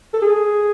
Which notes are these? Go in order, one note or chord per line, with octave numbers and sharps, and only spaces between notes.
A4
G#4